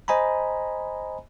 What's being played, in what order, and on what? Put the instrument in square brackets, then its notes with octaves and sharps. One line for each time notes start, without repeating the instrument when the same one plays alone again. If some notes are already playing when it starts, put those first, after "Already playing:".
[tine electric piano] C5 D#5 G#5 A#5 B5